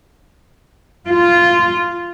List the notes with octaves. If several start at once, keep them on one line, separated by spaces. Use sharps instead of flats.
F4